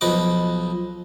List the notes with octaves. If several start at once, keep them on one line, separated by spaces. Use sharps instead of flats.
B1 F3 B4 D#5 D6